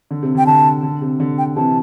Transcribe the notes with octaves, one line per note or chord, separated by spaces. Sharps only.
D3
C3
D3 G5
D3 A5
D3
C3
D3
G5
C3 E3 A5